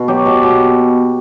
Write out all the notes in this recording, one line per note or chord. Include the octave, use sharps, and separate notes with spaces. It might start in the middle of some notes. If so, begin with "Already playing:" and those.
Already playing: B2
F#3 G4
B2
B2